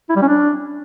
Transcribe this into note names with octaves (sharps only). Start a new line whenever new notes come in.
E4
G3
C#4
D4